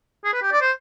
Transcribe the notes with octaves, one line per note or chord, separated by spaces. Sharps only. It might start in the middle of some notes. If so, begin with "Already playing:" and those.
G#4
B4
G4
D5
C5